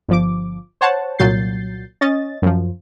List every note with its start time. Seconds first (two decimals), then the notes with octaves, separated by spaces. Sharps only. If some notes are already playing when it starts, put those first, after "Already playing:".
0.08 G1 F3 D6
0.81 C5 C#5 F#5 A5
1.19 C2 A#2 F#3 G6 A6 C7
2.01 C#4 D#5 A6
2.42 F#2 F3